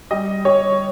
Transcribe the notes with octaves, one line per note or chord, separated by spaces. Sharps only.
G3 D#5
G3 C#5